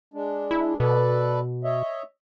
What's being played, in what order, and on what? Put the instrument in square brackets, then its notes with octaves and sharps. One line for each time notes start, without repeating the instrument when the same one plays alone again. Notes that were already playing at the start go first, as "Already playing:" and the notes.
[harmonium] G#3 D4
[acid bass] E4
[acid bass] B2 [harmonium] A4 B4 D5
[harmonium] C#5 D#5 E5